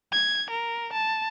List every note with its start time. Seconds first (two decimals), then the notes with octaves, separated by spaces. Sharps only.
0.13 G#6
0.50 A#4
0.93 A5